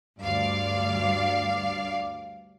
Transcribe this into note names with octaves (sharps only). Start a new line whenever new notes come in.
D2 G2 D5 F5